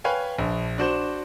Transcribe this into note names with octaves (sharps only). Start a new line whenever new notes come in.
B4 C#5 F5 G5 G#5
A#1
D4 F#4 C5